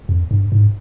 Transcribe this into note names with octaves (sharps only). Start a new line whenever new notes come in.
F2
G2
G#2